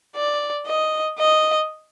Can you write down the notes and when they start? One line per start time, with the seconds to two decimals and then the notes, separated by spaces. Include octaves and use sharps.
0.16 D5
0.66 D#5
1.18 D#5